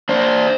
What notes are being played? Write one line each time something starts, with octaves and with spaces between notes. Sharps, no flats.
D4 C5